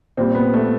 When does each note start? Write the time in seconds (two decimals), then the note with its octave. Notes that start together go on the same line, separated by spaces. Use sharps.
0.17 A#2 G3 C4
0.35 B3
0.54 A3